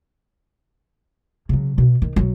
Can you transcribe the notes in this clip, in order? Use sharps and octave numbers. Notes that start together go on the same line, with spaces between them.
C#3 F#3
B2
D#3
B1 F#3